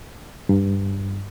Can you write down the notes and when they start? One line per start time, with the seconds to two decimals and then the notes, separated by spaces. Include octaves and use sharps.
0.49 G2